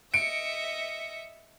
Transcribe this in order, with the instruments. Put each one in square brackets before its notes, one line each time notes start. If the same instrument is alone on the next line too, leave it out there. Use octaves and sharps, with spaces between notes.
[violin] D#5 E5 [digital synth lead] C#7 [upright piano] D7